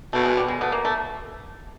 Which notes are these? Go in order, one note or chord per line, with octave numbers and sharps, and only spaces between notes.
B2 A3
G#3
G3
G#3
A3 B3
A#3
A3